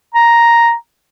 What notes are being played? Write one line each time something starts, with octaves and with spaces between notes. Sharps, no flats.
A#5